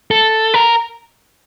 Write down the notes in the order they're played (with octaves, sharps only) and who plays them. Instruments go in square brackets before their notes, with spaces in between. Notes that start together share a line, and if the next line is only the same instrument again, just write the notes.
[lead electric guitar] A4
A#4